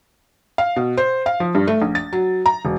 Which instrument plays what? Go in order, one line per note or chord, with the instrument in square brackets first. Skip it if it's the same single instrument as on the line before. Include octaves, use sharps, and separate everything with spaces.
[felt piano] F5
B2
C5
F5
F3
G2
A3
A#1
A6
F#3
A#5
E1